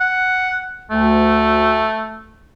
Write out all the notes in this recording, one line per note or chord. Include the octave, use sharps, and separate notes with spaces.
F#5
D2 A3